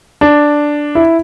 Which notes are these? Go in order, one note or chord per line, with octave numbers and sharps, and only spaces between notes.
D4
E4